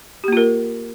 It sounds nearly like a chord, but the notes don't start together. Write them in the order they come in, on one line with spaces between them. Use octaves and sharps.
G4 A#3 F4 A#4